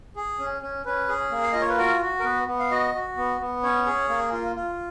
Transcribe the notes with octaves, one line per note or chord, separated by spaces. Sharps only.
G#4
C#4
C#4
C#4 B4
G#4
A#3
F5
F4 D#5
C#5
B4
F#4 A#4
F#4
A#4
B3 B4
B3
F5
F#4 D#5
F#4
B3
B3
C#4 C#5
G#4
A#3
F4
F4